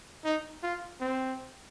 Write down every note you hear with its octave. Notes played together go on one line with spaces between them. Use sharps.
D#4
F4
C4